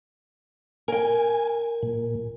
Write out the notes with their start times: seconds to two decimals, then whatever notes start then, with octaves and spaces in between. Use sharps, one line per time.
0.88 A#4 G5 G#5
1.83 A#2